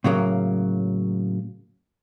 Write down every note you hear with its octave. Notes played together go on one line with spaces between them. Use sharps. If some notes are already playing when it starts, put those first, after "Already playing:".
A2 C#3 F#3 A#3